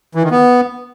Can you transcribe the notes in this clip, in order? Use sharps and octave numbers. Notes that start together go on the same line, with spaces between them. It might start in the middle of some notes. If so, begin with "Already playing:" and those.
E3
D#3
B3